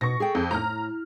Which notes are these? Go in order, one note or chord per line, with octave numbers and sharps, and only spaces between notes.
B2 C#6 A#6
G#4 A4 G5
F2
A2 A#5 F6